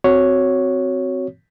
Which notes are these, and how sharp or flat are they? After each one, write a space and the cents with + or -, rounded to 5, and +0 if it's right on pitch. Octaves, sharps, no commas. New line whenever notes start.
C4 -10 F#4 +0 C#5 +0